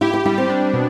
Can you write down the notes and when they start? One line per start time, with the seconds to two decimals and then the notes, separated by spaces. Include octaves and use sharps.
0.01 E4 G4
0.13 E4
0.25 G3 E4
0.38 C4
0.49 D4
0.74 B2